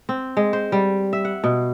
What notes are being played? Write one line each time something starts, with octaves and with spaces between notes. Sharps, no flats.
C4
G#3
C5
G3
E5
F#5
B2